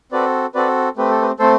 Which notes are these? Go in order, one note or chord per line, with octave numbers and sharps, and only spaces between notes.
C4 F#4 A4 B4 D5
C4 F#4 A4 B4 D5
A3 C4 G4 B4
A4
B4
A3 C4 A4 C5